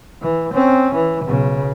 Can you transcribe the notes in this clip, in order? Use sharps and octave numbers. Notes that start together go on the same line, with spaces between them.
E3
C4 C#4
E3
B1 C#3